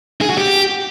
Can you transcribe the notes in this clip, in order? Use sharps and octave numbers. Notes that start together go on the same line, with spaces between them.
G#4
F#4
G4